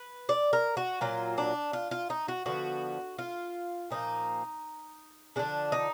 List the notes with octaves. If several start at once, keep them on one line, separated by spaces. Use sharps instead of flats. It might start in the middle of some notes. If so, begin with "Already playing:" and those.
Already playing: B4
D5
A#4
F#4
A#2 F#3 A#3 F4
D4
F4
F4
D#4
F#4
D3 F3 B3 F#4
F4
A#2 F3 A#3 D#4
D3 F3 G#3 D4
D#4